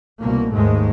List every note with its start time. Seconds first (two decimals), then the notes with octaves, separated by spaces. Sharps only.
0.21 C2 B2 A#3
0.53 D#2 G#2 G#3 A3